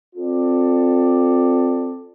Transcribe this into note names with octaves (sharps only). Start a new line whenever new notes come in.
C4 F4 A4 D5